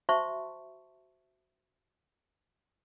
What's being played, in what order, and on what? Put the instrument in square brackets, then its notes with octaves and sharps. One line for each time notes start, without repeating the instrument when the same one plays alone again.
[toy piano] F#4 C5 E5 A5 C6 C#6